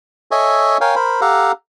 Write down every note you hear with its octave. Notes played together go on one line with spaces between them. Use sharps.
A4 C#5 D#5 E5 G#5 C#6
A#4 C#5 F5 G5 G#5
A#4 C5 B5
G4 A4 F5 F#5 A#5